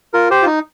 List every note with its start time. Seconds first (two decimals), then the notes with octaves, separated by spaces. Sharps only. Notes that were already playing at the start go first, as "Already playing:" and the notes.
0.13 F4 A#4
0.31 G4 C5
0.42 F4
0.46 D#4